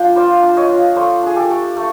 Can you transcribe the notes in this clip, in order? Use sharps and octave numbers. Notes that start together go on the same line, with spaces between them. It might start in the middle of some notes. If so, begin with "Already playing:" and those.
Already playing: F3 D4 F5 G5
F4 C5 D5
D4
C#5 D#5
F4
A3 C5 D5
D4 G#4
G4 A4
A3
A3